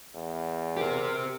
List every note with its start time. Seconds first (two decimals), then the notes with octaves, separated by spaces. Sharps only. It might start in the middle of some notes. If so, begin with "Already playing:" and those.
0.15 E2
0.77 G4 A#4 C5